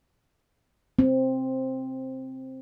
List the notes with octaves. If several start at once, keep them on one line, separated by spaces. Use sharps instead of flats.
C4